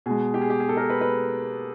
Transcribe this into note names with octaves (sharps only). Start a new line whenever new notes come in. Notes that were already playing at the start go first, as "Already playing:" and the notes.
B2 G#3 G#4
G4
G#4
G4
G#4
A4
A#4
B4
B4